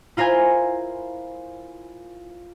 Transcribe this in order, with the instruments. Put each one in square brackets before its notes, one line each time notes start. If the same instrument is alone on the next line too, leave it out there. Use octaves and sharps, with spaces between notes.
[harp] E4 F4 A#4 C5 G#5